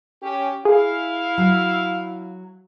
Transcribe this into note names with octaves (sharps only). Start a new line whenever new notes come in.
C#4 G4
E4 G#4 F5
F#3